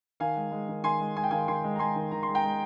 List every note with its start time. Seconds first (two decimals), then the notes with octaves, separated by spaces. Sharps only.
0.20 D#3 F5 G#5
0.36 G#3
0.52 G#3
0.69 D#3
0.83 D#3 G#5 C6
1.00 G#3
1.16 G#3 G#5
1.24 G5
1.31 D#3 F5 G#5
1.48 D#3 G#5 C6
1.64 G#3
1.76 A#5
1.79 G#3 G#5 C6
1.96 D#3
2.11 D#3 A#5
2.23 C6
2.28 G#3
2.35 G5 A#5
2.44 G#3